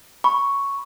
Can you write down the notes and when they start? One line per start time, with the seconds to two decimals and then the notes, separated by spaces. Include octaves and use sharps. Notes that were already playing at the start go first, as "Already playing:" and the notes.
0.24 B5 C#6